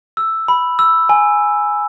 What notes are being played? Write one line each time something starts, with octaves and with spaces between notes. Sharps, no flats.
E6
B5
E6
G#5